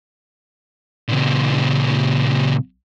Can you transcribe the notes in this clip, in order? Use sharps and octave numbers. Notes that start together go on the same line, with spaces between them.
C#2 A#2